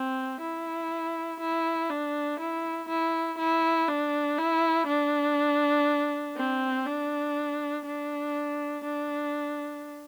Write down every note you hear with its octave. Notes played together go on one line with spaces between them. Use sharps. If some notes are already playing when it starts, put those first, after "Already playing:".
Already playing: C4
E4
E4
D4
E4
E4
E4
D4
E4
D4
C4
D4
D4
D4